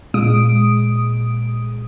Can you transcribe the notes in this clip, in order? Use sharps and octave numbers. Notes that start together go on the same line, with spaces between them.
A#2 G#3 D#6 D7